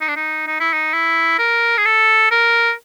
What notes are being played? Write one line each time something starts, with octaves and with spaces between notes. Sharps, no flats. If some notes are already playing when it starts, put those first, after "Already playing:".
D#4
D4
D#4
D#4
E4
D#4
E4
A#4
G#4
A4
A#4